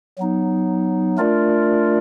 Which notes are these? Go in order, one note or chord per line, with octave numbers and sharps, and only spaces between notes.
F#3 B3 D#4
A3 D4 F4 A#4 D5